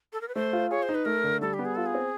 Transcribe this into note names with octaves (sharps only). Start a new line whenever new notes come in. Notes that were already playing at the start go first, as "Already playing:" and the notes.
A4
A#4
B4
A3 C5
F4
G#4 C#5
C5
D#4
B4
A3 A#4
D3
G3 A4
G4
B3
G#4
F4 A4
G#4
C4